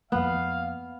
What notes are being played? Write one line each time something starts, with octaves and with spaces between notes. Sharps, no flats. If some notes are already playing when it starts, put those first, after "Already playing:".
F2 F3 A#3 B3 F5